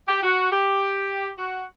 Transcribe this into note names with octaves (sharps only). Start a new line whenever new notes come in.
G4
F#4
G4
F#4